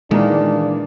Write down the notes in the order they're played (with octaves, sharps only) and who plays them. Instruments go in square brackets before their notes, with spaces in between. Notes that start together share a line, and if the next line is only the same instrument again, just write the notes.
[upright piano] A#2 E3 A#3 [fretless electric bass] D#3 [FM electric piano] G#3 [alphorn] D4